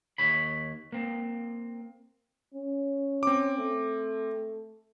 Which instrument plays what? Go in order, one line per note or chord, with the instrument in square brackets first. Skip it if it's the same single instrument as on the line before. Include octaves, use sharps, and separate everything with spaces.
[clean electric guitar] D#2 C#5 B5
A#3 C4
[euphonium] C#4
[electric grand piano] C4 D6
[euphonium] A3